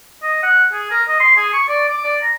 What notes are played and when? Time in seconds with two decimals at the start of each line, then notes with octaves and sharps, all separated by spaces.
0.22 D#5
0.43 F#5
0.73 G#4
0.91 A#4
1.08 D#5
1.20 C6
1.37 G#4
1.53 C#6
1.68 D5
1.88 D6
2.04 D5
2.22 A#5